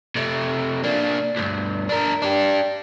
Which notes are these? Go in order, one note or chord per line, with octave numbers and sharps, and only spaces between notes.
C3 A3
A#3 D4
D2 G2
D4 A#4
D4 G4